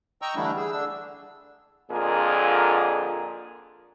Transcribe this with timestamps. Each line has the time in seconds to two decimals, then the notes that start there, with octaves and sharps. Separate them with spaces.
0.22 D#5 G5 A#5 C#6 E6
0.36 D3 E3 G3 A3 D4 E4
0.57 G#4 E6
0.72 D3 D4 E6
1.90 F2 A#2 D3 G#4 A#4